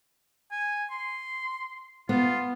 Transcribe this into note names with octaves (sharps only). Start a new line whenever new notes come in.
G#5
C6
B3 F4